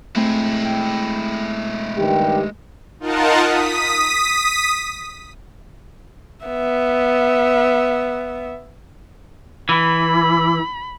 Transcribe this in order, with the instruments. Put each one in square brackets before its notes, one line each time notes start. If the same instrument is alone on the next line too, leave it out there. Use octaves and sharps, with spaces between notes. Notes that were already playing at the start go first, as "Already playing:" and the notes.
[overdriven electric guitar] G#3 E4 [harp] A3 C4 G#5
[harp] G5
[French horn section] G2 D#3 G4
[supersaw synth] D#4 F4 A#4 F#5 A5
D#6 B6
[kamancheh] B3 E5
[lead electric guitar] E3 [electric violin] B5